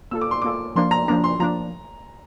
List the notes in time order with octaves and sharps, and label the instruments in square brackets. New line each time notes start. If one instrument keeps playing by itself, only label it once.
[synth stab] A#3 F4 A4 [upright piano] E6
[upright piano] D6
C6
[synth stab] A#3 F4 A4 [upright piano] D6
[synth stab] F3 A#3 D4 [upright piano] C6
[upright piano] A#5
[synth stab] F3 A#3 D4 [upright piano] A#5
[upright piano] C6
[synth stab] F3 A#3 D4 [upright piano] A#5